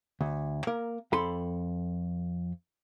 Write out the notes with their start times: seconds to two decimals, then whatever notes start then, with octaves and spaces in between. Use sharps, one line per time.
0.21 D2
0.67 A#3 A#4
1.12 F2 A4 B5 C6